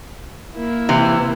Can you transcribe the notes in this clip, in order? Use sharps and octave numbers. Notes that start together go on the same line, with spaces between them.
A#3 E4
C3 E3